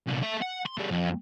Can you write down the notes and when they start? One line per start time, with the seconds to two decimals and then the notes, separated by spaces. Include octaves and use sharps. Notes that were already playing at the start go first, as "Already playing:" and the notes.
0.07 C2 A#2
0.22 A3 E5
0.42 F#5
0.66 C6
0.78 G3 A3
0.91 F2